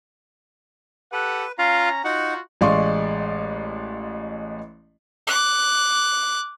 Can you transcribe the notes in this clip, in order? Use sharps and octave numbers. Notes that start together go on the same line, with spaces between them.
G4 A4 B4 F#5
C#4 F4 F5 A#5
D#4 F4 F#4 F#5
A1 G#3 D5 F5 C6 C#6
D6 F#6